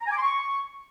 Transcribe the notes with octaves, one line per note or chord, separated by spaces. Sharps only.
A#5
G#5
D6
C6
C#6